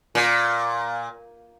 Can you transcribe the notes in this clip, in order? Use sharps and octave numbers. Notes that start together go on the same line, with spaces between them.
A#2